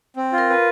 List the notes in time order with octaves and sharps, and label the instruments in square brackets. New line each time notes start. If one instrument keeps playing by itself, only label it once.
[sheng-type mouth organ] C4
F4
[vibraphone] A#4
[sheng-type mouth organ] B4